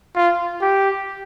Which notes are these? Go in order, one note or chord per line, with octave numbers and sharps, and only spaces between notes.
F4
G4